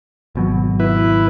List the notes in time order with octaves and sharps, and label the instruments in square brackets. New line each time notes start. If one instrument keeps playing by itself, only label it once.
[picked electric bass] G#1 B2 F#3
[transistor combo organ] E4 B4